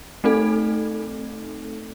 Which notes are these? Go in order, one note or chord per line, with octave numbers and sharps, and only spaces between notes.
A3 C4 D#4 A4